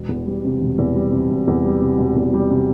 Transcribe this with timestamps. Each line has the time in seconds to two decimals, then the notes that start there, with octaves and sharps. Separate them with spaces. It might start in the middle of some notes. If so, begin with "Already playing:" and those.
Already playing: E1
0.09 E2
0.26 G3
0.44 C3
0.61 E1
0.78 E2
0.95 G3
1.12 C3
1.29 E1
1.47 E2
1.64 G3
1.81 C3
1.98 E1
2.16 E2
2.34 G3
2.50 C3